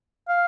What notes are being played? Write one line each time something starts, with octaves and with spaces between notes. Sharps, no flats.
F5